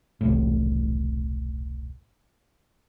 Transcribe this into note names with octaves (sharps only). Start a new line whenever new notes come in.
E1 C2 A2